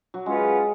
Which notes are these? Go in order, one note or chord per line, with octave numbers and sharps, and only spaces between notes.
F#3
G#3 C#4 F4 B4 F#5